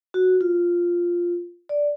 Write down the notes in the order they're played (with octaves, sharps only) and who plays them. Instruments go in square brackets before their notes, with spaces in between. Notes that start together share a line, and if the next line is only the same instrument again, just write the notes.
[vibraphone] F#4
F4
D5